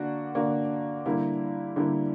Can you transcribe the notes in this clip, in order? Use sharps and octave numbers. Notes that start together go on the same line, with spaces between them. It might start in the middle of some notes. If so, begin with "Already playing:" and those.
Already playing: D3 A#3 D4 F#4
D3 A#3 D4 F#4
D3 G3 A#3 E4
D3 G3 A#3 E4